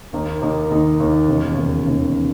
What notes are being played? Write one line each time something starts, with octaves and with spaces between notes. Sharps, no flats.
D#2 D#3 A#3 D#4
D#2 D#3 A#3 D#4
D#2 D#3 A#3 D#4
D#2 D#3 A#3 D#4
E1 D#2 C#3
E1 D#2 C#3
E1 D#2 C#3